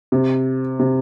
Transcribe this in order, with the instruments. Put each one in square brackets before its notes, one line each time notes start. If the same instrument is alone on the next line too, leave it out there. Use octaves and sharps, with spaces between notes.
[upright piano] C3
C3